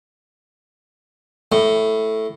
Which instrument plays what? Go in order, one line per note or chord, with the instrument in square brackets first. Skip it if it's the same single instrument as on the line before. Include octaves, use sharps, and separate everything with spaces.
[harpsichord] A2